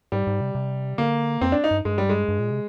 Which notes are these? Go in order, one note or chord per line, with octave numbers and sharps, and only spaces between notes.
G#2 G3
G#2
C3
C3
D3 A#3
F2 C4
D4
D#4
G2
G2 G#3
G3
G#3
G2
A#2
C3